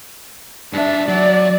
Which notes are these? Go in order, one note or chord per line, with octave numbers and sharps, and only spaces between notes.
G2 D4 E5
F#3 D5